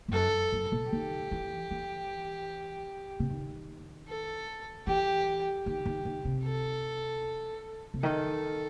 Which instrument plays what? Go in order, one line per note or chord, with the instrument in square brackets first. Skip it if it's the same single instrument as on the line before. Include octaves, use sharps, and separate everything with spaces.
[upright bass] G2
[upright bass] F#2 [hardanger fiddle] A4
[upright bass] F#2
B2
[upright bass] D#3 [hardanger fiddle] G4
[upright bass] E3
E3
C3
D#3
[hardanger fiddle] A4
[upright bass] E3 [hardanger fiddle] G4
[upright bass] D#3 [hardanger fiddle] G4
[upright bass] D#3
D#3
C3
[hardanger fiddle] A4
[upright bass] C3
[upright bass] D#3 [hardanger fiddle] A4